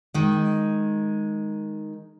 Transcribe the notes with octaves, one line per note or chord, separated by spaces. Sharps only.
D#3 G#3